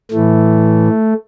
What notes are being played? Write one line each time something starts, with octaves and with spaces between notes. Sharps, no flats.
A2 E3 A3